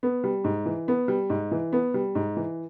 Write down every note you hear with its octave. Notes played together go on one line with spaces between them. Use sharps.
B3
G3
G#2
E3
B3
G3
G#2
E3
B3
G3
G#2
E3